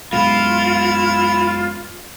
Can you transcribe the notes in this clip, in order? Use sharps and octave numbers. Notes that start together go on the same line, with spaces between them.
F#2 B2 G#3 E4 F4